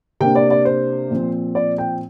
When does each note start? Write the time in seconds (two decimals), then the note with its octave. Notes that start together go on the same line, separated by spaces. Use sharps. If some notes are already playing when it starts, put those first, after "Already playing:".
0.20 C3 A#3 D4 G5
0.35 D5
0.50 D5
0.65 C5
1.11 A#2 F3 C4
1.55 D5
1.78 G5